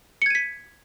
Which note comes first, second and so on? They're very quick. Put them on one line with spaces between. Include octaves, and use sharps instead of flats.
C#7 G#6 D#7 B6